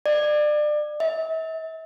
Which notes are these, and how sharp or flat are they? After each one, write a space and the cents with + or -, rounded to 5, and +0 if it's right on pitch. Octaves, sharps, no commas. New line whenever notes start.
D5 +30
E5 -40